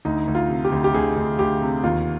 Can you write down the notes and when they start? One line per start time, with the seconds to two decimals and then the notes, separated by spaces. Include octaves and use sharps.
0.05 D2 D#4
0.28 D2
0.35 F4
0.49 C3
0.64 G4
0.72 D2
0.84 G4
0.94 D2 G#4
1.16 D2
1.39 D2 G4
1.61 C3
1.83 D#2 F4